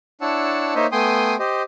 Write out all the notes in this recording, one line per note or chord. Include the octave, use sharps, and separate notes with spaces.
D4 E4 C#5 F#5 A5 E6
A#3 D#4 C5 C#5 D#5 E5
A3 B3 G5 G#5 C6 D#6
G4 C5 D#5